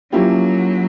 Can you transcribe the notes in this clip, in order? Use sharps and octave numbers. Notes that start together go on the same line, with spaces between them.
F3 F#3 A#3 C#4 E4 G4